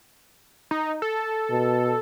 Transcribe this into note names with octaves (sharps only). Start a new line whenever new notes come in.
D#4
A4
B2